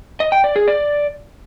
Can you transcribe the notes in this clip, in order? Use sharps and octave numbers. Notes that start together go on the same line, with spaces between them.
D#5
G5
D5
G#4
D5